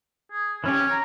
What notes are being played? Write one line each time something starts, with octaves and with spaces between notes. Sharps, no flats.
G#4
E3 C#4 G4 C#5
A#5